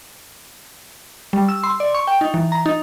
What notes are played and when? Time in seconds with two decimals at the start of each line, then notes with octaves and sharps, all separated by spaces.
1.33 G3
1.49 E6
1.63 C6
1.80 D5
1.95 C#6
2.07 G5
2.21 D#4
2.34 E3
2.52 A#5
2.66 D#4